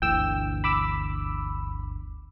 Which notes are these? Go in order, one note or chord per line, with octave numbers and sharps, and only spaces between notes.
G1 D2 E3 G5 E6
B5 D6 E6